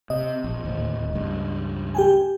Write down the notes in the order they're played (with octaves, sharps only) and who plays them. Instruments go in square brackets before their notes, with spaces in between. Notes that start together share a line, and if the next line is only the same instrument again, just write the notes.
[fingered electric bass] C3 [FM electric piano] D#5
[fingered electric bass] A#1
D1 D#2
C#2 G2
[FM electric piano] G4 G5 G#5